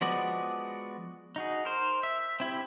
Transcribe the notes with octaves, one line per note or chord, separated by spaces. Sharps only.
F3 G#3 B3 F#4 D5
D#4 F#4 G#4
A#4 C5
E5
C4 E4 G4